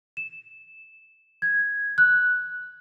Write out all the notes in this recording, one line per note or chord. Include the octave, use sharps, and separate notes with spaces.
E7
G#6
F#6